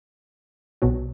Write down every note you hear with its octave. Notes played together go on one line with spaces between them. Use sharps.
B1 B2 F#3